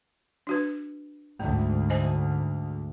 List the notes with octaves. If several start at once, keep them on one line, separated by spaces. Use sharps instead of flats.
D4 F#4 B4
D2 G#2 A3
C5 D#5 G#5